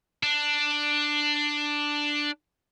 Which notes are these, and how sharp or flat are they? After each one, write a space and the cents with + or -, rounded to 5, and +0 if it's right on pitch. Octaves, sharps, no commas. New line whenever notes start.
D4 +5